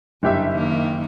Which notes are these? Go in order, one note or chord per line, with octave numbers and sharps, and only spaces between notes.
F#1 G2 D3 G4 E5
D#3 A#3